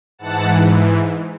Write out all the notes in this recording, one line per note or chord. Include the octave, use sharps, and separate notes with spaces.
G#2 E3 F#5 A5